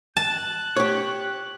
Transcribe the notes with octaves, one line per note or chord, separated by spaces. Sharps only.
A5 F#6
G4 C#5